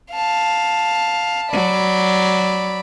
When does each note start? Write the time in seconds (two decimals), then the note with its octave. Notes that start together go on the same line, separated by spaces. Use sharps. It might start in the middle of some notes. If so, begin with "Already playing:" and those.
0.13 F5 A5
1.52 F#3 D5 B5